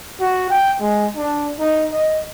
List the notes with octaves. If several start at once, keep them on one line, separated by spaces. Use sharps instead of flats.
F#4
G5
G#3
D4
D#4
D#5